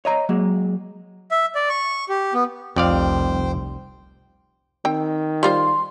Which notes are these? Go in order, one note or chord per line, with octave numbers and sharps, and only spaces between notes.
C#5 D#5 A#5
F#3 G#3 A#3
E5
D5
C#6
G4
B3
F1 C2 F2 G3 C5 D5 F5 G5
D#3 C4 G5
G3 F4 C5 C6